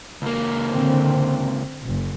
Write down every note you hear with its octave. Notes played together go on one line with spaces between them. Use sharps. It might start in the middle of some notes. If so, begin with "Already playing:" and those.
C#2 A#3
D3 C4
F#1